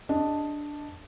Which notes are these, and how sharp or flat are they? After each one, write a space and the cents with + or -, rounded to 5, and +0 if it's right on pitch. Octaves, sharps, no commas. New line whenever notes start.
D4 +0 G#4 -45 D#5 +0